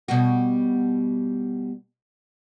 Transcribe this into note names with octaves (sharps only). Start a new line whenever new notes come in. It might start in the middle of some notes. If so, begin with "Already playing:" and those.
B2 G3 F#4